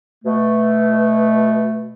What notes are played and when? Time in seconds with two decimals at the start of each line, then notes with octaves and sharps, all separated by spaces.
0.25 B2 A3